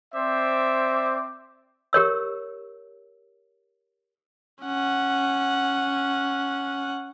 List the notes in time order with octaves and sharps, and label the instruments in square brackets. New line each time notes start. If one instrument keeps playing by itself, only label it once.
[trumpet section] C4 C5 D5 E5 D6
[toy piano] G4 A#4 C#5 E6
[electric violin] C#4 F#5